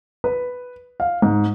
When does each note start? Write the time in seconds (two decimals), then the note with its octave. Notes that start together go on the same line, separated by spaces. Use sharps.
0.24 B4
1.00 F5
1.22 G#2